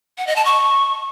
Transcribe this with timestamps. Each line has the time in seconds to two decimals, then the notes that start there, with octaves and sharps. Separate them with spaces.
0.18 F#5
0.27 D#5
0.36 A5
0.45 C#6